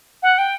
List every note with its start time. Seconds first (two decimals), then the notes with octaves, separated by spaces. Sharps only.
0.23 F#5
0.38 G5